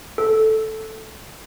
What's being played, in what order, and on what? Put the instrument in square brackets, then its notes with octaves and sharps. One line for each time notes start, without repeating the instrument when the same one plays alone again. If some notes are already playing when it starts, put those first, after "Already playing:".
[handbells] A4